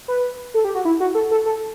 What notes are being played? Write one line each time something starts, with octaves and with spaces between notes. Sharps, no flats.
B4
A4
G4
F#4
E4
F#4
A4
A4
A4